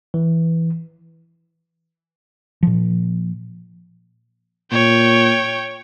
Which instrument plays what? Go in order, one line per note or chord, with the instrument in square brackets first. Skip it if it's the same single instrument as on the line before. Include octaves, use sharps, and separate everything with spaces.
[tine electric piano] E3
[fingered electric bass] A#2 F3
[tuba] A#2 [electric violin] C#5 G5